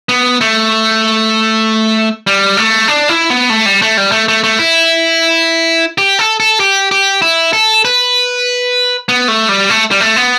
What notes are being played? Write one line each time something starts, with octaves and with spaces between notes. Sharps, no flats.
B3
A3
G3
A3
D4
E4
B3
A3
G3
A3
G3
A3
A3
A3
E4
G4
A4
A4
G4
G4
E4
A4
B4
B3
A3
G3
A3
G3
A3
B3